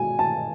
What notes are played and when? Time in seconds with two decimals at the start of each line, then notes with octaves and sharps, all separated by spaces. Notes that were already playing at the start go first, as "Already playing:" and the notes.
Already playing: B2 G#3 G#5
0.19 A5